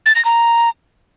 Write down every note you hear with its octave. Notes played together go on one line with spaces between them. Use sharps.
A6
A#6
A#5